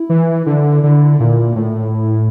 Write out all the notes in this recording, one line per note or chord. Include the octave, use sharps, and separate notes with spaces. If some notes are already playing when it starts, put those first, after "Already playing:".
Already playing: E4
E3
D3
D3
A#2 E4
A2